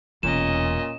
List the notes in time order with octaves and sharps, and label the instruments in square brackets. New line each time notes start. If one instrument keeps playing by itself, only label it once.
[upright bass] E1 E2 [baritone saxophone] A#2 [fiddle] C#4 D#5 [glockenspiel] E7